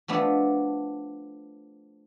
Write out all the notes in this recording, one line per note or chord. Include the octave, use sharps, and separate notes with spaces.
F3 A3 B3 D4